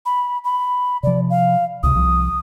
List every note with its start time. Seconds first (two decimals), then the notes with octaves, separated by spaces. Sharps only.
0.06 B5
0.44 B5
1.03 C3 F3 D5
1.30 F5
1.83 C#2 C3 D#6
1.95 C2 F3